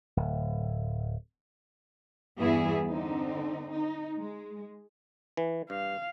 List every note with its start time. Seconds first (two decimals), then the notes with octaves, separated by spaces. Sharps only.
0.17 D1
2.37 E2 G2 E3 B3 E4 G#4
2.88 D3 C4 D#4
3.70 D#4
4.16 G#3
5.37 E3
5.70 G2 F5